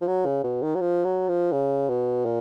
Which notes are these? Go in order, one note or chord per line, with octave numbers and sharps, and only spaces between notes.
F3
F#3
C#3
B2
D#3
F#3
F3
F#3
F3
C#3
B2
A#2